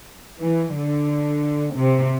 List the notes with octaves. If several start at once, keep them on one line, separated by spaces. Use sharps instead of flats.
E3
D3
C3